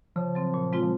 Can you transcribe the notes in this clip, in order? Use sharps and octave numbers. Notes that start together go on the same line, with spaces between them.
C#3 F3
F#3 C4
A#2
G#3 C4 F4
F3